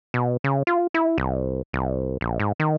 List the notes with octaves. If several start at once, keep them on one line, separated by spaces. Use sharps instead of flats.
B2
C#3
F4
E4
C2
C2
A#1
G#2
D#3